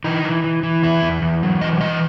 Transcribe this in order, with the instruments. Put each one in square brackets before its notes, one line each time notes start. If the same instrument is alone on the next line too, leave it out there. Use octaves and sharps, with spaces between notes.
[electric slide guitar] E3 D#4
E3
E3
E3
E2 E4
E2
E2
F#3
E3 D#5
E3 D#5